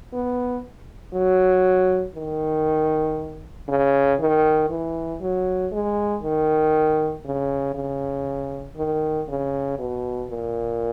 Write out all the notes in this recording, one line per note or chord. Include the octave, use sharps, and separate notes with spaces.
B3
F#3
D#3
C#3
D#3
E3
F#3
G#3
D#3
C#3
C#3
D#3
C#3
B2
A#2